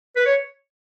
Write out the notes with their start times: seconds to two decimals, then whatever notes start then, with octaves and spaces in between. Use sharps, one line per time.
0.16 B4
0.25 C#5